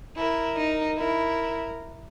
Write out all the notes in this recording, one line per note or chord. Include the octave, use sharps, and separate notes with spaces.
E4 A#4
D#4
E4 A#4